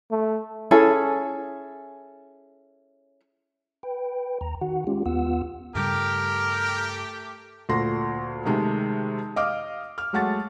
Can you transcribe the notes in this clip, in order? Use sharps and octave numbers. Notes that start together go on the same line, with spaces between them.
A3
C#4 E4 G#4 A4
B4 G5
D#2 A#5
D#3 F#4 F#5
G#3 C#4 F4 G4
D#2 B3 F4 F#5 E6
G2 C#3 G3 A3 G4 A#4
D2 A#2 A4 C6 A#6
C3 D#3 G#3 A3
D#5 F5 D6 F6
F6
F#3 G#3 A3 F#5 C#6 A6